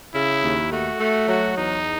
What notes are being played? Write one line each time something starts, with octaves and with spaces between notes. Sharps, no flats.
C#3 E4
D#2
A3 F#4
A3
F#3 F#4
E2 D#4